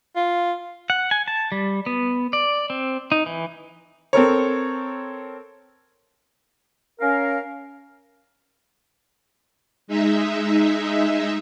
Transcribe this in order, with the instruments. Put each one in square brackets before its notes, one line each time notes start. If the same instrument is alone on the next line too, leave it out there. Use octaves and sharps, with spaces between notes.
[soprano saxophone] F4
[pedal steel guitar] F#5
G#5
A5
G3
B3
D5
C4
D#4
E3
[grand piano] C4 A4 A#4 C#5
[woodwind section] C#4 A#4 F5
[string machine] G#3 D#4 E5